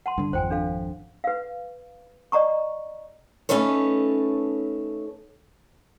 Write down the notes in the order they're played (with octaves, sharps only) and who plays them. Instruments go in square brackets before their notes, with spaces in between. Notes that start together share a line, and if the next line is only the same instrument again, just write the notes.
[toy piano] F#5 A5 C6
[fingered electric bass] G2 D3
[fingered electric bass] G#1 F2 F3 [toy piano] C5 G5 G#5
[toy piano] D4 A4 F5
B4 F5
D5 D#5 A#5 C#6
[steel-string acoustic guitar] A3 C#4 D#4 A4 B4 C#5